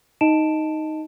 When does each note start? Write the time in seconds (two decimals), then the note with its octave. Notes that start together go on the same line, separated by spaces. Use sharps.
0.21 D#4 D#5 A5 D7 E7